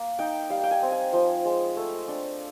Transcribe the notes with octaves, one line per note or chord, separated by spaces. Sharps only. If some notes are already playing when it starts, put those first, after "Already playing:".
Already playing: A#3
D#4 G5
G3 F5
G5
G#5
C4
G#5
F3 G5
G#3
A3
D4